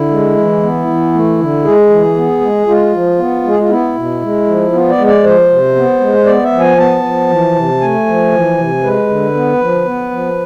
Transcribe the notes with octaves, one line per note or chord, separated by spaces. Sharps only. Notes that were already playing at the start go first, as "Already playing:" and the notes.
Already playing: D3 E4
G#3
E3
B3
E3
A3
D3
G#3 G#4
E3
B3
G#3
G#3 F4
F3
B3
G#3 G#4
F4
B3 E4
B2
G#3
F3
B3 F4
D5
G#3
D5
F3 C5
C3
B3
G#3
B3 D5
E5
F3
G#5
B3 A5
F3
E3
C3
A3 G#5
F3
E3
C3
G#3 B4
D3
B3
F3
B3
F3